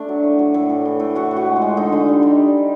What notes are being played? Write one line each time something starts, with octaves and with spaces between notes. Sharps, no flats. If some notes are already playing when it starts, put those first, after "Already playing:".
Already playing: A3 D4
F#3
A2
F#3
A2
E3
E3
A2
E3 F#4
A2
F#4
G#3
F4
G#3
D3 D#4
D3
G3
G3